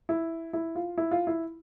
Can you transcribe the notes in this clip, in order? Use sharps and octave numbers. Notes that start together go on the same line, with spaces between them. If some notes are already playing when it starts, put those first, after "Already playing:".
E4
E4
F4
E4
F4
E4